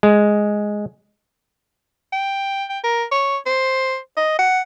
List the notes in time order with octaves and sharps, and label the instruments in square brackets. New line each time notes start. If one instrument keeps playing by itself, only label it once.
[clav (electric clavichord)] G#3
[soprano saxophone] G5
G5
A#4
C#5
C5
D#5
F#5